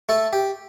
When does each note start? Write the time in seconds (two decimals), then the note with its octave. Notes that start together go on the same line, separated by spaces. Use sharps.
0.09 A3 A4
0.33 G4